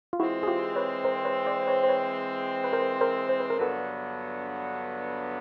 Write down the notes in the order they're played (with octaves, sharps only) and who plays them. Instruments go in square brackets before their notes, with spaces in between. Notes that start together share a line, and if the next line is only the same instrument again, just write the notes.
[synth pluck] F4
[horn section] E3 G#3 C4 [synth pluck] E4 F#4
[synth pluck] G#4
F4 G4
B4 C#5
A#4 C5
B4 C#5
C5 D5
C5
B4 C#5
C5
B4 C#5
B4
A#4 C5
A#4 C5
C5
B4
A#4
[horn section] G2 D3 F#3 B3 [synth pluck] A4 B4